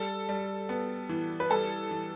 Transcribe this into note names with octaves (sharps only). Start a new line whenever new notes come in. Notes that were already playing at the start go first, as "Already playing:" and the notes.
Already playing: G3 A4
G3
B3
E3
B4
G3 A4
E3